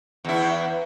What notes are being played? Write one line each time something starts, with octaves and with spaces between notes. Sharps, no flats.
E2 E4